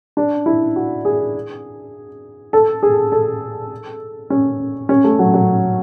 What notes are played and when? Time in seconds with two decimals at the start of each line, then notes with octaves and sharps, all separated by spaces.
0.17 D4
0.46 E4
0.76 F#4
1.05 G#4
2.53 A4
2.83 G#4
3.12 A4
4.30 C#4
4.89 C#4
5.04 A3
5.19 F#3
5.34 F#3